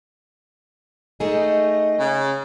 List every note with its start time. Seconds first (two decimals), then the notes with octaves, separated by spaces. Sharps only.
1.20 A3 D#4 G#4 D#5
1.99 C#3